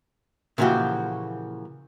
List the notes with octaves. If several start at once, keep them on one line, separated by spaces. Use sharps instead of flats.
A#2 C#3 E3 F3 F#4 G4